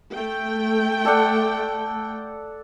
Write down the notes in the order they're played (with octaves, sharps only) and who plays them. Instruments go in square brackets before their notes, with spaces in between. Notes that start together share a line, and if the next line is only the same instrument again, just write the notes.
[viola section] A3 G5
[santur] A4 D5 F#5